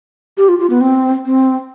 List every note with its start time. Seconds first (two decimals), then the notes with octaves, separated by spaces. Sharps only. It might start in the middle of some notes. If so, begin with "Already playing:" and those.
0.37 G4
0.49 F4
0.59 F4
0.70 B3
0.81 C4
1.25 C4